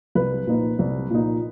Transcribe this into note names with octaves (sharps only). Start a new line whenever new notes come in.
C2 B4
A#2 F3 A#3 D#4
C2
A#2 F3 A#3 D#4